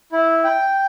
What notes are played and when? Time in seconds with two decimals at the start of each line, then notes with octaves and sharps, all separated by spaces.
0.12 E4
0.44 G5